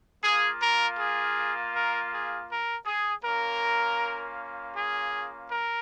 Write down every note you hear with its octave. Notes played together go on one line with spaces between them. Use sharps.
A#3 F4 G#4
A#4
G#4
A#4
G#4
A#4
G#4
A#3 C#4 F4 A#4
G#4
A#4